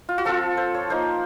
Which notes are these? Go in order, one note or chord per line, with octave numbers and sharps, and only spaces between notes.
F4
F#4
F3 C4 F4 A4
C5
C#5
F3 A#3 D#4 C5